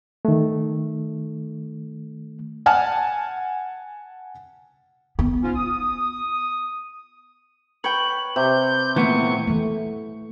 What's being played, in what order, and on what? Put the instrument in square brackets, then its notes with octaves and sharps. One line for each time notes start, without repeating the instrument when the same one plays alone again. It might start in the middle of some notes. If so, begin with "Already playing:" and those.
[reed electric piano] D#3 A3
[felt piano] F#5 G#5 A5 F6
[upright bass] B3
[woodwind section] G#2 C#4 F4
D#6
[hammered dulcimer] B4 [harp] C#5 G5 [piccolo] F#7
[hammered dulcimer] C3 [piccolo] G6
[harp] A#2 A3 [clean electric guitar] E3 B3 [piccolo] C#6
[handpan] E3 A3